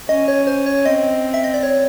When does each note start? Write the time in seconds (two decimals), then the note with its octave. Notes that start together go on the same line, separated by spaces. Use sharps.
0.09 C#4 D#5
0.28 C#5
0.47 C5
0.66 C#5
0.86 C4 D#5
1.34 E5
1.44 D#5
1.54 D5
1.63 C#5